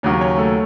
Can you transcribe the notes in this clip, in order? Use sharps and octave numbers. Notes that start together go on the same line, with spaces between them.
D#2 C#3 F#3 C#4 C#5
C#4 C#5
A3 A4